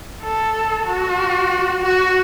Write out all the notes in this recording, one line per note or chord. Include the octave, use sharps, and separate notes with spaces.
A4
F#4
F#4